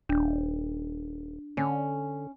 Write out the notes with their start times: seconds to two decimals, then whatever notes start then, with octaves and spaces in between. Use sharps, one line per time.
0.09 D#1 D4
1.57 D3 C#4